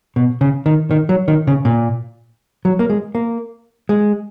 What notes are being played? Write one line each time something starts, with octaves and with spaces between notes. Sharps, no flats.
B2
C#3
D#3
D#3
F#3
D#3
C#3
A#2
F#3
A#3
G#3
A#3
G#3